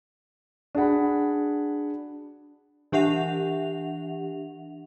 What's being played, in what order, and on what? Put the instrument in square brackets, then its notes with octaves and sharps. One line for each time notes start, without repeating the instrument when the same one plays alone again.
[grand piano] D4 F#4 G#4 F#5 B5
[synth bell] E3 D4 G4 E5 F#5 F7